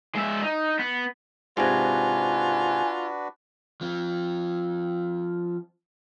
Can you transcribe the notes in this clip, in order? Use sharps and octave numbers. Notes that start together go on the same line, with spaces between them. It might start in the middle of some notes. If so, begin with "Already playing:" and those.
G#3 E5
D#4
B3
G#2 C3 D4 F4 F#4 B4 G#5
F3 C4